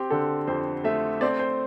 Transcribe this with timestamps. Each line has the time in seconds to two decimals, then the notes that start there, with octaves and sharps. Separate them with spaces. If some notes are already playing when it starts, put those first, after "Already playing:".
Already playing: C4 G4
0.10 D3 A4
0.47 F2 C5
0.84 A3 E5
1.21 C4 D5
1.39 C5